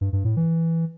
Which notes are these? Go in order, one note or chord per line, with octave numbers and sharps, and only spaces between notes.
G2
G2
A2
E3